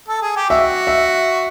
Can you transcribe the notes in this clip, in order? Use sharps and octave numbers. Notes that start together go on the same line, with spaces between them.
A4
G#4
G4
F#4 E5
E5